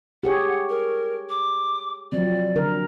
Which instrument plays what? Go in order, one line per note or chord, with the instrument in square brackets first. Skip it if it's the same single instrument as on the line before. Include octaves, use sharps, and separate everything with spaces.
[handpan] G4 G#4 C#5 [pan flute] F#5
[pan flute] A#4
D6
[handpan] F3 F#3 C4 [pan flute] D5
[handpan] D3 A#4